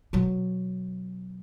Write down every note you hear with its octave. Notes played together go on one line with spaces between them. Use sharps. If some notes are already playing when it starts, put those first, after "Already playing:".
B2 F#3